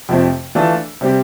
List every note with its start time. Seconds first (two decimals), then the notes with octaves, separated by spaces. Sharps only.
0.09 F2 C3 F3 A3 C4
0.55 E3 A3 D4 F4 A4
1.01 C3 G3 C4 G4